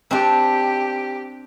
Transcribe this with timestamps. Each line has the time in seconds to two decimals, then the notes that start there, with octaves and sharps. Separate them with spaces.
0.11 C4 D4 G4